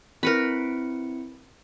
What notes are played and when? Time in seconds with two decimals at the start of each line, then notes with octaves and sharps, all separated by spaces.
0.23 C4 E4 A#4 B4 B5 C#7